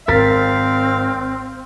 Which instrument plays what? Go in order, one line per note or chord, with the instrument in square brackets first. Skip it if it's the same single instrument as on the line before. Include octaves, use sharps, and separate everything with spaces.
[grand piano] G#1 [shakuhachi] C4 [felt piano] A#4 A6 B6 [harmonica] F5